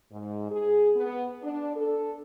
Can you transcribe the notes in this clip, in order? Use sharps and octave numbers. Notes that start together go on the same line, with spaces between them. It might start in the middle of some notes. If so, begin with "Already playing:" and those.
G#2
G#4
B3
D4
A4